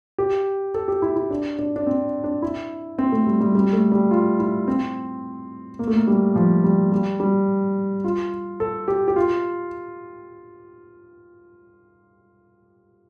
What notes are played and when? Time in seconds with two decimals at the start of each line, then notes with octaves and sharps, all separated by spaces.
0.18 G4
0.74 A4
0.88 G4
1.02 E4
1.16 E4
1.30 D4
1.59 D4
1.76 D4
1.87 C4
2.24 D4
2.42 E4
2.98 C4
3.12 A3
3.26 G3
3.40 G3
3.55 G3
3.73 A3
3.92 G3
4.11 F4
4.39 E4
4.68 C4
5.79 A#3
5.88 A3
5.97 A#3
6.07 G3
6.36 F3
6.64 G3
6.92 G3
7.20 G3
8.04 F4
8.60 A4
8.88 G4
9.08 G4
9.16 F4